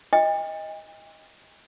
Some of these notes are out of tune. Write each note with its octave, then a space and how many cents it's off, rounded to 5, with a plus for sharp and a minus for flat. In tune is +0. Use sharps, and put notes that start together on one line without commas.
D#5 +15 G5 +45